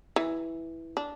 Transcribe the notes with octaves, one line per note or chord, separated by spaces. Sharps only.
E3
D4